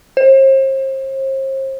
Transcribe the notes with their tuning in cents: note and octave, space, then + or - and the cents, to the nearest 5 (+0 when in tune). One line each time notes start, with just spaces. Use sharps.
C5 +40